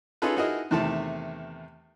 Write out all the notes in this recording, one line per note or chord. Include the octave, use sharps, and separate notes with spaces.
C#4 D#4 F4 G#4 A4 B4
D#4 E4 F#4 G#4 A#4 D#5
E2 C3 D#3 A3 A5